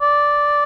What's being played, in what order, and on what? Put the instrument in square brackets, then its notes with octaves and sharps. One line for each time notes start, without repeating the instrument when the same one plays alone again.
[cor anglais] D5